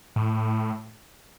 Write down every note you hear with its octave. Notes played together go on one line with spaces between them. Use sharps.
A2